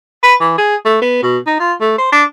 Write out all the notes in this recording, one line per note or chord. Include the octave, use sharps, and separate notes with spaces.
B4
E3
G#4
A3
B3
B2
D#4
F4
A3
C5
D4